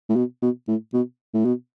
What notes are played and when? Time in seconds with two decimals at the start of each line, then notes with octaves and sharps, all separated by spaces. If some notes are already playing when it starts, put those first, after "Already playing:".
0.09 A2
0.16 B2
0.42 B2
0.68 A2
0.94 B2
1.34 A2
1.45 B2